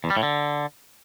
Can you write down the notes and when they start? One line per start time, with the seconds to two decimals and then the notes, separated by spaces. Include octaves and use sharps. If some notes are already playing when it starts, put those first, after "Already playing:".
0.04 E2
0.10 G3
0.17 A2
0.23 D3